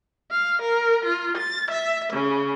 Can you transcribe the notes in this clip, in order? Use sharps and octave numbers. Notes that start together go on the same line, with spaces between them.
F5
A#4
F4
A6
E5
C#3